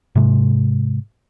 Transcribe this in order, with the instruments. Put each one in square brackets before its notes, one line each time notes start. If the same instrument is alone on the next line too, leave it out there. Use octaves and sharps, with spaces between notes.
[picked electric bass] G#2 C3 G#3